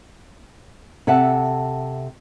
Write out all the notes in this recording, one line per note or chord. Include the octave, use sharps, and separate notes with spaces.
C3 A4 E5 F#5 A5